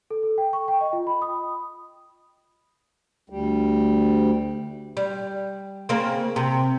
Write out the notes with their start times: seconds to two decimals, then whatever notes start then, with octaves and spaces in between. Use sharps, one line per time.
0.10 A4
0.23 A4
0.38 G5
0.53 C#6
0.68 G5
0.81 D#5
0.93 F4
1.07 B5
1.22 D#6
3.30 D2 G3
4.97 G3
5.89 C#3 A#3 C4
6.36 C3